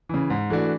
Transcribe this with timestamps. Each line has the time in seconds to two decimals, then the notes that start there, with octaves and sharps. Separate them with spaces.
0.09 C#3 E3
0.30 G#2
0.50 E3 A3 D4 F#4